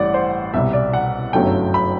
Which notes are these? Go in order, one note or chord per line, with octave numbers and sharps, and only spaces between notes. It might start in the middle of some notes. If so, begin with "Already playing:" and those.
Already playing: A1 A2 G3 D5 F#5
C5
C2 B2 G3 E5
D5
F#5
G1 F#2 F#3 A3 E4 G5
B5